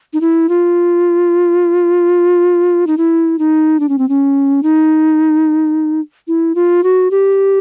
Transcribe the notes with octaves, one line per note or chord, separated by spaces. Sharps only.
D#4
E4
F4
D#4
E4
D#4
D4
C#4
C4
C#4
D#4
E4
F4
F#4
G4